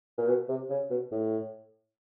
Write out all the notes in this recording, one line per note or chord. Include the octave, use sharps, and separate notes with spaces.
A#2
B2
C3
C#3
B2
A2